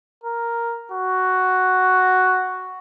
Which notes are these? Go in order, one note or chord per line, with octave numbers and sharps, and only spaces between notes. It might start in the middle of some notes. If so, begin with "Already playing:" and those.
A#4
F#4